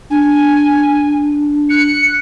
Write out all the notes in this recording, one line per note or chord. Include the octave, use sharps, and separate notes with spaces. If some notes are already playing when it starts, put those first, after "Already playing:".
D4 G#5
F#6 C#7